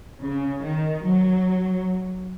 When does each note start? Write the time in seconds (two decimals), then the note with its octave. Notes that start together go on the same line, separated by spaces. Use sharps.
0.22 C#3
0.64 D#3
1.05 F#3